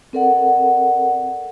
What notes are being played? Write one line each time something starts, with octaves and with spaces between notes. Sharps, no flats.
C4 A4 A#4 D5 F#5